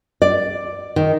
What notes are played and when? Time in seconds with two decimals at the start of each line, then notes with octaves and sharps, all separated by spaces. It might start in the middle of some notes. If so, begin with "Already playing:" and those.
0.22 D5
0.96 D#3